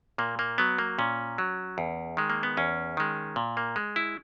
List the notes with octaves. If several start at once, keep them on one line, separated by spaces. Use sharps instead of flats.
A#2 A#3
A#3
F#3 B3
A#3
A#2 C#4
F#3
E2
D#3 G#3
A#3
B3
E2 C#4
D#3 G#3
A#2
A#3
G#3
E4